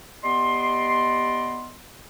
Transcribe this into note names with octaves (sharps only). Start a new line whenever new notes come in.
B3 G4 D5 D#5 C6